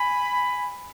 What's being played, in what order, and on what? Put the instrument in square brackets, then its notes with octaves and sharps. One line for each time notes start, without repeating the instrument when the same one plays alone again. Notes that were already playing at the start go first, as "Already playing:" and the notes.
Already playing: [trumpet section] G#5 B5